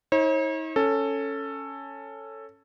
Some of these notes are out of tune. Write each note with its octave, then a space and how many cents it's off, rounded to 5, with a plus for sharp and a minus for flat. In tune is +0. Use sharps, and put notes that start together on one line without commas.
D#4 +45 C#5 -40
C#4 +0 A4 +10